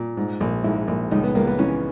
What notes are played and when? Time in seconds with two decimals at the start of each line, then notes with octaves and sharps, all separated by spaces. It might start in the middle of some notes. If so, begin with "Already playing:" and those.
Already playing: A#2
0.17 G#2
0.40 A#1
0.64 G#2 E4
0.88 A#1
1.11 C#2 D#4
1.23 B3
1.35 C#2 A#3
1.47 B3
1.59 E3 C#4